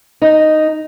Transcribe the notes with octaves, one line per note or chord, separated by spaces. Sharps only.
D#4